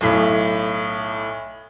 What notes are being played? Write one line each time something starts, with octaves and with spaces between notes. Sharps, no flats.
B1 A2 B6